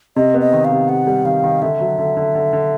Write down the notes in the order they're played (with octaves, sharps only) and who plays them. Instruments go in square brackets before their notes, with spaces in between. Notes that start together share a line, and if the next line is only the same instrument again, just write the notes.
[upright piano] C3 [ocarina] D#5
[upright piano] B3
[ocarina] D#5
[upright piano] D#3
[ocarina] F5
[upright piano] C3
[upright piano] C3 [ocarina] F#5
[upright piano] G3
[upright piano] D#3 [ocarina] F5
[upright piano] D#3
[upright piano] D3 [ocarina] E5
[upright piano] F#3
D3
D3
D3
D3